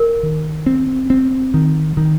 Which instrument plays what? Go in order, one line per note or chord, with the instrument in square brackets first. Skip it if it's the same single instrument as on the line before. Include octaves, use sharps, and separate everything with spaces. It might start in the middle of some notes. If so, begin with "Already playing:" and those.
Already playing: [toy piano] A#4
[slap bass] D#3
C4
C4
D#3
D#3